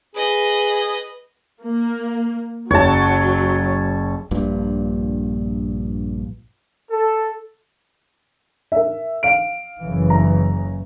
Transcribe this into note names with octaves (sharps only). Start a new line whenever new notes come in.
G#4 B4 D#5
A#3
F#1 F#3 C#5 A5
A#1 G2 A#2
A4
A#4 E5
F5 D7
F#1 C#3 E3
A#5